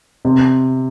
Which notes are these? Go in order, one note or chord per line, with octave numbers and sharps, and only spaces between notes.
C3